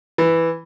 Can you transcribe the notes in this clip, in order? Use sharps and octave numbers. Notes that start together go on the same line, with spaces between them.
E3